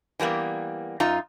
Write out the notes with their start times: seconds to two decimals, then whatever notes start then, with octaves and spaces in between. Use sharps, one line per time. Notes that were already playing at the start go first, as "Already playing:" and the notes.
0.19 E3 G3 A#3 B3
1.00 F#2 D#4 F4 A#5